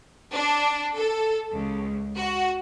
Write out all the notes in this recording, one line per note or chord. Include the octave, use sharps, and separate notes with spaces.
D4
A4
C#2
F#4